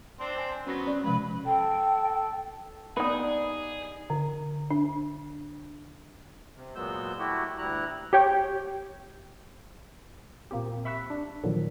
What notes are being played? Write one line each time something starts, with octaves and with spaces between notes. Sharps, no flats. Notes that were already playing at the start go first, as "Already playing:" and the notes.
C4 D4 C5
G#5 C6
F#3 B3 C#4 A#6
C#4 D5
C3 F3 G#3 B4
A4 G5
G3 B3 D#4 E4 G#4 B4 D5
D3
D4
C3
A#2 F#3 G#3 B3 E6 G6
A3 E4 F#4 G4
D2 G3 E4 A#5 F#6
G4 C#5 G5
A#2 A#3 C4 G4
E5 B5 C#6 E6 F#6 B6
D4
A#2 D3 D#3 F3 F#3